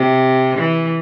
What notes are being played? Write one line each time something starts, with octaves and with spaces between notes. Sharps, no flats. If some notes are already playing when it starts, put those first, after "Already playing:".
Already playing: C3
E3